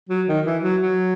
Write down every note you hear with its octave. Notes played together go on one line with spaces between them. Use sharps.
F#3
D#3
E3
F#3
F#3